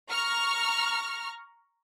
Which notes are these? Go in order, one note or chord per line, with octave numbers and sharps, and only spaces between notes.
A#5 C#6 F6